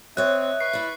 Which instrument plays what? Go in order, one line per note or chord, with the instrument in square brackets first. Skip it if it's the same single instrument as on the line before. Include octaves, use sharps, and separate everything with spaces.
[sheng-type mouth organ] C4 [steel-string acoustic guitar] C#5 D#5 [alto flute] E5 [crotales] F#6
[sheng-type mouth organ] B4 C#6 [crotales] C7
[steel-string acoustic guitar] E4 D5